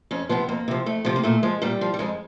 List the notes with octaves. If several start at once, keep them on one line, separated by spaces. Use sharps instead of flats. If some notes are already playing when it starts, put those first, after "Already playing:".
F2 C#4
C3 F3 B3
F2 A#3
C3 F3
F2 A3
C3 F3
A#3
A#2 A3
F3 G#3
A#2 G3
F3
G3
F2 G#3